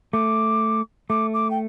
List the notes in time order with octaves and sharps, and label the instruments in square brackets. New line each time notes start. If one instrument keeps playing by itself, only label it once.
[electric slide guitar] A3 [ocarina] D6
[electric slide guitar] A3 [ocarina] D6
[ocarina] D6
G5